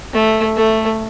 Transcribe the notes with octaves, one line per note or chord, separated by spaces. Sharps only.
A3
A3